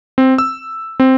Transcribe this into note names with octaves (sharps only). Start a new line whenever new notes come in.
C4
E6
C4